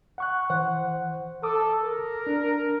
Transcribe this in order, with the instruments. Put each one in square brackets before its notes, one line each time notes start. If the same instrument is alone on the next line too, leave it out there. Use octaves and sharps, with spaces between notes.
[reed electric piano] F#5 C#6 F#6
E3 C5 F#5
[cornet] A4 [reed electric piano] D6 D#6
[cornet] A#4
[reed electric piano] D4